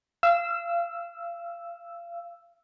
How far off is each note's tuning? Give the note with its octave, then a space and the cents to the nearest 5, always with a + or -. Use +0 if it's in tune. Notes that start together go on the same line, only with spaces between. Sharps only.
F5 -30 E6 +0